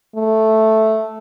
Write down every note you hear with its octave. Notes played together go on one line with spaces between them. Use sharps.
A3